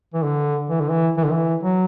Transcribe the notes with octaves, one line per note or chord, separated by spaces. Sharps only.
E3
D3
E3
D3
E3
E3
D3
E3
F#3